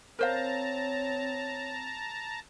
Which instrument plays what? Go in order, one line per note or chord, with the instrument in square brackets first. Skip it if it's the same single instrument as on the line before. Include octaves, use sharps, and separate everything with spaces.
[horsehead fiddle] C4 [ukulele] A#4 C5 F5 [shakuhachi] C#5 [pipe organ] A5 A#5